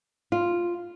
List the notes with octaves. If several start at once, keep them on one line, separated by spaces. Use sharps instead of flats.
F4